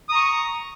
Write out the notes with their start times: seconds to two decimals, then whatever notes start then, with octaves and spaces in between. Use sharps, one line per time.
0.09 D#6
0.12 A#5
0.15 C#6